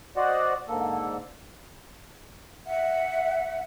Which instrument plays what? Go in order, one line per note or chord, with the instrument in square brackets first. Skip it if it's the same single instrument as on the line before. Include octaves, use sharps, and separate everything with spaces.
[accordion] F#4 C5 D5 D#5 F#5
G#2 D3 A#3 A4
[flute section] E5 F#5